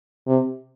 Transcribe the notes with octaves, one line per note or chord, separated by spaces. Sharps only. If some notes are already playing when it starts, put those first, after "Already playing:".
C3